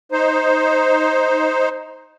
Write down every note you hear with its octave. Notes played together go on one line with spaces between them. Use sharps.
D#4 C5